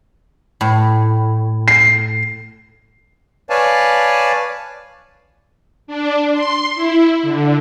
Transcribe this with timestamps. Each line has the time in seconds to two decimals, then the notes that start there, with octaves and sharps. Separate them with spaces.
0.61 A2
1.68 C7
3.50 B4 C#5 D5 F5 G#5 A5
5.87 D4
6.32 C6
6.75 E4
7.23 D3